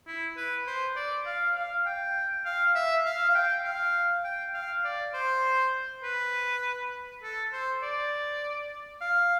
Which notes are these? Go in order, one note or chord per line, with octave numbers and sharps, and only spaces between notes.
E4
B4
C5
D5
F5
F5
G5
F5
E5
F5
F5
G5
F5
G5
F5
D5
C5
B4
A4
C5
D5
F5